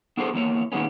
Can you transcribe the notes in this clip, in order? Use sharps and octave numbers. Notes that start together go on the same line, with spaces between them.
B3 D4 G#4 A4 C5
E2 A#3 C#5
A#2 D#3 G#3 B3 C#4